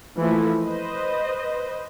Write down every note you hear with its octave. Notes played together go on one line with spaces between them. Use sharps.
E3 F3 A3 A#3 E4 A4
B4 C5 D#5